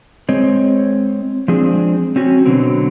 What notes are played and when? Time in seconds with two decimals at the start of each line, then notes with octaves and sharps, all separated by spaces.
0.29 G#3 C4 C#5 D#5
1.48 F3 G#3 C4 D4 G#4
2.16 C4 C#4 F#4
2.45 B2 D3 F#3 C4